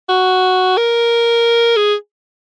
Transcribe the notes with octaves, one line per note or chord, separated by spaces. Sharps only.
F#4
A#4
G#4